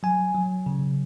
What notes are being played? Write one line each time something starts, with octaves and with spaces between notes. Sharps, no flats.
F#3 G#5
F#3
C#3